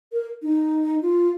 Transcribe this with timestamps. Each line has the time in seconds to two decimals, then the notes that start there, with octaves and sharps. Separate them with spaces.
0.13 A#4
0.42 D#4
1.02 F4